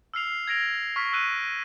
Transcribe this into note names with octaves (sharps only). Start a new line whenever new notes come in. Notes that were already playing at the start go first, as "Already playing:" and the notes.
E6 F6 C7 F7
G#6 A#6 D7 F7
C#6 F6 B6
E6 F#6 D#7